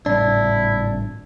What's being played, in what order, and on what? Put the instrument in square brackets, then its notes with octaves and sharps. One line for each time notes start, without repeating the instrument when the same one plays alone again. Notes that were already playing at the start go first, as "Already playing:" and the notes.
[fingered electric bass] G#1 A2 G3 [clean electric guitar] D4 [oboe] E4